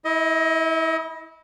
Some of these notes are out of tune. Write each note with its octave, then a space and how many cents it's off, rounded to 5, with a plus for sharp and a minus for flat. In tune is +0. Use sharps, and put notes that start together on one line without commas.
E4 -25 D#5 +20